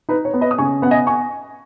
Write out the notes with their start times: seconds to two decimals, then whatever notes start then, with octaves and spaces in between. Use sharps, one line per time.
0.09 D#4 B4
0.25 C#5
0.34 B3
0.41 B4 D#5
0.51 D#6
0.58 C#3 G#5 C#6
0.82 B3 F#5
0.91 D#5 G#5
1.07 G#5 C#6